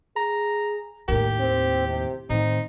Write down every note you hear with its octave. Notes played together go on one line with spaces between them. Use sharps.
G#4 A#5
D#2 A2 G4 A#4
C4
C3
A2 D#3 C4 D#4